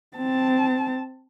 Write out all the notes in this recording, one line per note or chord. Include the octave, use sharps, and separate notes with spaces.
C4 A5